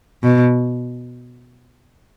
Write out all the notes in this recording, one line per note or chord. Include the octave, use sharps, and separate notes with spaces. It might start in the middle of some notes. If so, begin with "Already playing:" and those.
B2